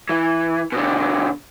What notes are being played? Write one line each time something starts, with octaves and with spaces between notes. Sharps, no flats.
E3
B2 D3